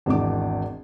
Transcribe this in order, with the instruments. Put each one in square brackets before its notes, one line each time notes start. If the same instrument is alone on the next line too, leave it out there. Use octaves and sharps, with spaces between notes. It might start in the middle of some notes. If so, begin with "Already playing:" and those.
[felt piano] G#1 E2 D#3 D4 D6